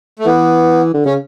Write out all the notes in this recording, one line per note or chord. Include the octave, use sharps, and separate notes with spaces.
A3
E3 B3
D3
C#3 C#4